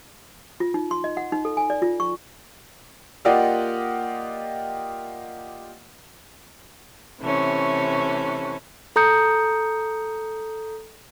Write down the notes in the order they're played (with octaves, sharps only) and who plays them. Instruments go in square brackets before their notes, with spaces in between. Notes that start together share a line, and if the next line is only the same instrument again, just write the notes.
[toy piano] F4
D#4
C6
D#5
F#5
D#4
A4
G#5
D5
F4
C#6
[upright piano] A#3 F4 G4 D5 D#5 F#5
[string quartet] C3 E3 A3 C#4
[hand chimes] A4 A#5 D#6 G6 C#7